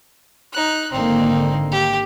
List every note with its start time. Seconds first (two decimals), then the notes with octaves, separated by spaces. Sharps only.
0.53 D#4 F#6
0.92 G#1 D3 A#3 C4 D#4
1.72 G4